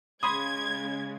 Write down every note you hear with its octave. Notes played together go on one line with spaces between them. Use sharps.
C#3 G#3 B5 C6 D#6 G#6